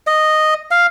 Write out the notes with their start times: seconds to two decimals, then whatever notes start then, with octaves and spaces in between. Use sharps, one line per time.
0.07 D#5
0.71 F5